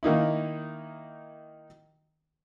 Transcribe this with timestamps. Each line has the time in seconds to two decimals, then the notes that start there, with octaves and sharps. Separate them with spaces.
0.03 D#3 A#3 D#4 E4